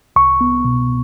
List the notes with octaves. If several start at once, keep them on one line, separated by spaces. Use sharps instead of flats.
C2 C#6
B3
B2